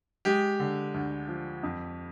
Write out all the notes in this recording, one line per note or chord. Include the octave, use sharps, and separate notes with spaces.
G#3 G4
D3
D2
F3
F2